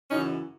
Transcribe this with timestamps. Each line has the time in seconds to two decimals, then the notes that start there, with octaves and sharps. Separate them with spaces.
0.10 F#2 C#3 E3 C#4 D#4